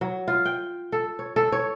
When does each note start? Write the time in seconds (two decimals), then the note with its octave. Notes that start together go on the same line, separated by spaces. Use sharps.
0.01 F#3
0.28 F4
0.45 G5
0.92 A4
1.19 C#5
1.36 A4
1.52 C#5